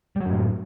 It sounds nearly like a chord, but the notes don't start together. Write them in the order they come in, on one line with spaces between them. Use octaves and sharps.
G3 F#3 F#2 A2